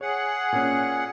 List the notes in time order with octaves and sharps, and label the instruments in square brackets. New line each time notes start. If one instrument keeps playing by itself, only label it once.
[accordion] G#4 F#5 [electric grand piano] C#5
[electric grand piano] A#2 C#4